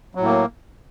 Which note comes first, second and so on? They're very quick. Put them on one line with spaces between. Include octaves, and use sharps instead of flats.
F#3 A2 A#3